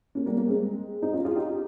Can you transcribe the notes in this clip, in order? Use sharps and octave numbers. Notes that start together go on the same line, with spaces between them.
A#3 C#4
G3 A#3
G3 A#3
G#3 C4
C4 D#4
C#4 F4
F4 G#4
D#4 G4